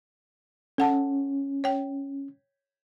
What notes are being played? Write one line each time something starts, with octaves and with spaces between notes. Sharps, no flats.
C#4 A4 F#5 A5
C#5 G5